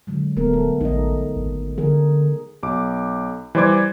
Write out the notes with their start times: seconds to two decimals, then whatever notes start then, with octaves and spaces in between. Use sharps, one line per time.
0.07 D3 F#3 G#3
0.37 D#1 A3 B3 A#4
0.54 A4
0.81 A1 D#4 D#5
1.36 G#1
1.78 D3 G#4 A#4
2.63 B1 D6
3.55 E3 G3 C5 D5 D6 G#6